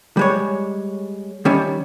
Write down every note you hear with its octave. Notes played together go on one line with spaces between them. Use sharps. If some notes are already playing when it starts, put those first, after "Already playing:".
G3 G#3 C#5
D#3 G3 C#4